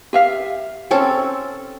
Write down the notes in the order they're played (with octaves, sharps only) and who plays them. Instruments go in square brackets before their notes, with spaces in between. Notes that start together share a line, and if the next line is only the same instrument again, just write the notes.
[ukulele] G4 E5 F5
[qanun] C4 C#4 A4